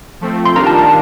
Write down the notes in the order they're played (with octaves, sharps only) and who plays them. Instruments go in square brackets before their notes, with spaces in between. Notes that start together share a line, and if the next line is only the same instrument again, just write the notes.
[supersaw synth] F3 A3 C4
[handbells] C6
[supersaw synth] D#3 G3 D4 F4 A#4 [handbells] A#5
[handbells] A5
A5